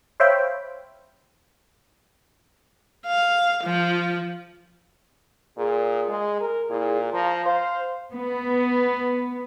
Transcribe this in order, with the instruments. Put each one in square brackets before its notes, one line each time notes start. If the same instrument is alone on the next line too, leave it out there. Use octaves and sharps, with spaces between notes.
[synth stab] C5 C#5 E5 F5 G5 B5
[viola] F5
F3
[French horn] A#2 [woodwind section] G#4
[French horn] G#3
A#4
[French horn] A#2 [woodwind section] E4 G#4
[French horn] F3 [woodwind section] F5 A#5
[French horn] C5 [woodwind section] F5
[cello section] B3